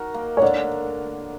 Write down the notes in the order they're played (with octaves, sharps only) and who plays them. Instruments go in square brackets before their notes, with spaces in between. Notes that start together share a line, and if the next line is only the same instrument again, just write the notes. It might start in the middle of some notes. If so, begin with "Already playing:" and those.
Already playing: [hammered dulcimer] D#4 F#4 A#4
A#3
[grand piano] C#5
[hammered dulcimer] D3 [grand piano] D5